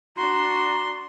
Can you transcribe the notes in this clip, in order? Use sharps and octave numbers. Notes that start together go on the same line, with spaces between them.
D4 F#4 A#5 C6